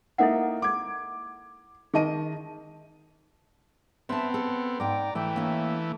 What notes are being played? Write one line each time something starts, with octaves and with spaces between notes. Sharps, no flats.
A#3 D#4 E4 A4 E5 F#5
D6 G#6
D#3 G#4 D#5 A5 D#7
B3 C4 E5 A5
A4
G#2 D5 G5 A#5
E3 A3 G5
A#3 C#4